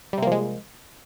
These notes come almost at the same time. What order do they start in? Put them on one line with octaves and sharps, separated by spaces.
G3 C3 A#3 F3 G#3